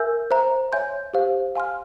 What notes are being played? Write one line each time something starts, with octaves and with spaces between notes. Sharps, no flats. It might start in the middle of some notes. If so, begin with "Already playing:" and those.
Already playing: A#4 E5 G#5 E6 G6
C5 E5 A#5
C#5 E5 G#5 C6 G6
G4 C5 F5
F5 G#5 C6 F6